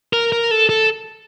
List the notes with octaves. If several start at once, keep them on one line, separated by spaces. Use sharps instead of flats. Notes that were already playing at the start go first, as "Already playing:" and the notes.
A#4
A#4
A4
A4